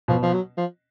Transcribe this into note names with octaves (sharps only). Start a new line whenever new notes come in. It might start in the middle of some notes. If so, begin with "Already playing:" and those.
B2 F3
F3
F#3
F3